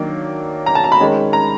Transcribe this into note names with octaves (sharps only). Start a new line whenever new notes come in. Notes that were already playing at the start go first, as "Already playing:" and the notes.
Already playing: D#3 F#3 A#3 D4
A#5
A5
A#5
B5
D#3 G#3 C#4
A#5